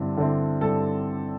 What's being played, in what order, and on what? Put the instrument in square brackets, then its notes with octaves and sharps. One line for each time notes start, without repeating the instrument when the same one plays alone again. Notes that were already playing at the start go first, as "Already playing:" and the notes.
Already playing: [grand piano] G2 D3 C4 E4
D3 C4 E4
G2 A4